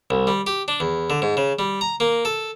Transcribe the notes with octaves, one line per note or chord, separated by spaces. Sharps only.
C2
G3
G4
D4
E2
D3
G#2
C#3
G3
A#5
A#3
A4